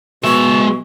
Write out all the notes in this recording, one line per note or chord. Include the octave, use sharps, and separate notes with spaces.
B2 G#3 E5 C#6